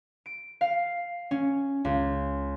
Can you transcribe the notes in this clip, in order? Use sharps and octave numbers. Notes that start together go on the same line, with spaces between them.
D7
F5
C#4
C#2